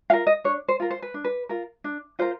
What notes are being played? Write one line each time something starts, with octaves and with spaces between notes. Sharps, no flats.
F4 A#4 F5
D#5
D4 C#5
C5
F4 A#4
C5
B4
D4
B4
F4 A#4
D4
F4 A#4 C5